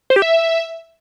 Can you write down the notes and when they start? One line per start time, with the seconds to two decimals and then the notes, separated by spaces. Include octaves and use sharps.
0.10 C5
0.16 G4
0.22 E5